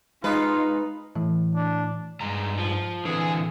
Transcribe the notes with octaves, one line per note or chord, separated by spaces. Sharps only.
G#3 D#4 F4 B4
A2 E3
D4
G2 G#3 A#5
F3
D3 E3 C4 G#4